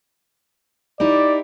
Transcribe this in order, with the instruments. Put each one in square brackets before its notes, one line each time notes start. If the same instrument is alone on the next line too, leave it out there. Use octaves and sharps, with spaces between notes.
[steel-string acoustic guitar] D#4 E4 G4 [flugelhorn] D5